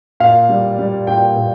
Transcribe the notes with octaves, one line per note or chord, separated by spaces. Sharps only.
A#2 F5
G3
G3
A#2 G5
A#2